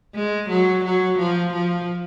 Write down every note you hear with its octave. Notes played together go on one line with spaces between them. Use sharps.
G#3
F#3
F#3
F3
F3